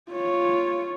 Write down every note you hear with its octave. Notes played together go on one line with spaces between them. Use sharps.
F4 C#5